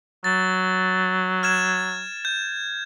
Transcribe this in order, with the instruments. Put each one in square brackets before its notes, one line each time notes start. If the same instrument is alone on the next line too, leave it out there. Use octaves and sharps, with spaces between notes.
[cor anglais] F#3 [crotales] A6
[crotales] F6 G#6 E7
G6